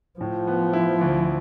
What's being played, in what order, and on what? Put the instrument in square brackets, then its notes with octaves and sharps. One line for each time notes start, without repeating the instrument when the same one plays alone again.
[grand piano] A2 [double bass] F3
[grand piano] B3
E4
D2